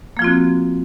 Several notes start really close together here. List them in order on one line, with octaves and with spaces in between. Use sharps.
A#3 F3 F4 C4 F#4